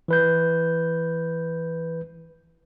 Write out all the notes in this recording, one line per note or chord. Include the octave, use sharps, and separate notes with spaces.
E3 B4 G6